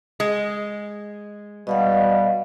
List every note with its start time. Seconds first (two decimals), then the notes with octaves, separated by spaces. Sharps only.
0.20 G#3
1.67 B2 G3 D#5 F5 F#5